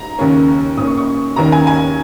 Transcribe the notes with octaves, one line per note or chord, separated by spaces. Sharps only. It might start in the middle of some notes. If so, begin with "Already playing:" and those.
Already playing: A#5
D#2 C#3 A#3 C#4
A#2 A#3 C#4 D#6
C#6
C#6
D#2 D#3 A#3 C#4 A#5
G#5
G#5